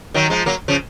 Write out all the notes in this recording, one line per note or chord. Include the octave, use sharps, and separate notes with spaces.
D#3 F#3
F3 G#3
F#3 A#3
C#3 F3